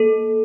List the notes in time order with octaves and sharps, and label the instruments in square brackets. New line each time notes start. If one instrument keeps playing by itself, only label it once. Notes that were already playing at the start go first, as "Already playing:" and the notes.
Already playing: [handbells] A#3 A4